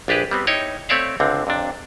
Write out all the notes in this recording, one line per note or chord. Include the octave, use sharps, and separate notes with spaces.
A#1 D4 G4 G#4 B4
G3 B3 C4
D#4 E4 C#5 G5
A3 C4 C#5 D5 E5 F5
C#2 D3 C4
F2 C3 D4